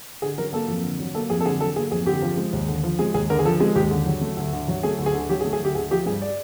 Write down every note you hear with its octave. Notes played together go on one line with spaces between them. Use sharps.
D3 G#4
F#3 A#4
A#3 A4
F2
D3
F#3
A#3 A4
F2 G#4
A4
D3 G#4
F#3 A4
A#3 G#4
F2 G#4
D3 G4
F3
G#3
D#2
D3
F3
G#3 G#4
D#2 G#4
D3 A#4
G#4
F3 A4
G#3 G#4
D#2 G4
D3
F#3
A3
D2
D3
F#3
A3 G#4
D2
G#4
D3
F#3 G4
G#4
A3
G#4
D2 G4
D3 G#4
F3 G4
G2 G#4
D5